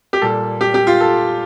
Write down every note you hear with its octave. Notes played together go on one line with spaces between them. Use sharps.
G4
A#2 G3 A#3 A4
G4
G4
F4
A4